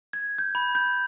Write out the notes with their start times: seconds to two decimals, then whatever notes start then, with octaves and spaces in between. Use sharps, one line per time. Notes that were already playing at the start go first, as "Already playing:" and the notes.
0.13 G#6
0.39 G6
0.55 B5
0.75 G6